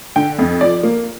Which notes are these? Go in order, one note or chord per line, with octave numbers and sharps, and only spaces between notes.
D3 G5
F2
F3 D5
A#3